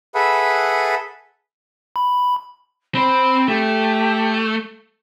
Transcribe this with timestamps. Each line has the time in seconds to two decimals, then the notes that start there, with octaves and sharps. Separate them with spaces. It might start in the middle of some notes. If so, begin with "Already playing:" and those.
0.15 G#4 A4 B4 E5 F#5 B5
1.96 B5
2.95 C4 C5 B5
3.48 A3 G4